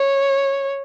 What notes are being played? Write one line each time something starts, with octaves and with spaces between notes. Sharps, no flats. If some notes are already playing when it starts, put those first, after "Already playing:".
Already playing: C#5